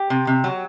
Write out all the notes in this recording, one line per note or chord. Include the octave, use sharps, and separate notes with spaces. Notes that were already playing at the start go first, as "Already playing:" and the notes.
Already playing: G4
C3
C3
F#3